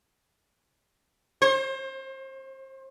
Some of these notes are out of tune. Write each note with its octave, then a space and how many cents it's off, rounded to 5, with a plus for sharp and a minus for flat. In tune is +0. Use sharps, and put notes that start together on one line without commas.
C5 +30